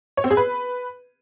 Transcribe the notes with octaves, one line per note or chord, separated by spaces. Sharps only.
C#5
C4
G#4
B4